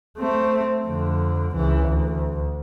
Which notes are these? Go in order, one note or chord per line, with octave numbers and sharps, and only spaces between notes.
A3 C4
F2 D3
C#2 E3
D2